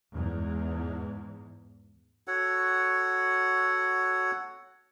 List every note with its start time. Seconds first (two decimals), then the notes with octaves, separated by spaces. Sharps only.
0.14 E2 G#2
2.28 F#4 A4 C#5 F#5